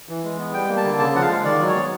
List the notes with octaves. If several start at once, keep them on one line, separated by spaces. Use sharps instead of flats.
E3
G#3
B3
G3 G5
A#3
A5
D3
C#3 A5
F3 F#5
F5
G#3
D#3 D5
F#3
C#5
B3